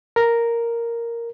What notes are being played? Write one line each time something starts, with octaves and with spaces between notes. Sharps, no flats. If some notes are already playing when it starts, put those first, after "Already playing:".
A#4